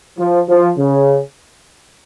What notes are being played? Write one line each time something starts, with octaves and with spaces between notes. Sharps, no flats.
F3
F3
C#3